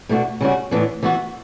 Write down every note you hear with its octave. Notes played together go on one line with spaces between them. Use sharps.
B2 A3 D4 F#4
C#3 G3 C#4 F#4
A2 E3 B3 D4
E3 B3 F#4